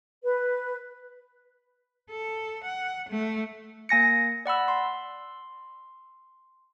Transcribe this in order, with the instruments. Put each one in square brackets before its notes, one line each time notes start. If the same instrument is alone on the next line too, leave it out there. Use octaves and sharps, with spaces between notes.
[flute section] B4
[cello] A4
F#5
A3
[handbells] A#3 G#5 A#6 C#7
D5 F#5 B5 E6
C6